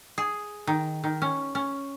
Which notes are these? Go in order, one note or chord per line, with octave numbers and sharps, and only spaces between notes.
G#4
D#3
D#3
C#4
C#4